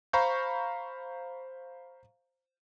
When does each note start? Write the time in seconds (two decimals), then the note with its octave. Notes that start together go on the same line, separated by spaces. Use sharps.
0.13 C5 F5 A#5 B5 C#6 G6